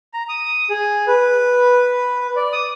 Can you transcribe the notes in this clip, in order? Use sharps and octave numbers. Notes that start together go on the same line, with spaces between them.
A#5
D#6
G#4
B4
D5
D#6